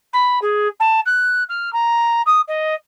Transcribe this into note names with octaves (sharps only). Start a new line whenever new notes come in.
B5
G#4
A5
F#6
F6
A#5
D#6
D#5